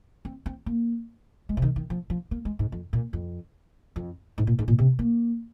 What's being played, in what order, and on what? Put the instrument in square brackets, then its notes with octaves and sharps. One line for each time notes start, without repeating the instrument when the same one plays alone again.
[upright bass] C4
C4
A#3
G#3
C3
D#3
D#3
F3
F3
A#3
G#3
G#2
F2
A#2
F2
F2
G#2
A#2
G#2
A#2
C3
A#3